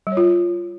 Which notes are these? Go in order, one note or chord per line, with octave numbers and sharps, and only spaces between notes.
G3
C#5
F4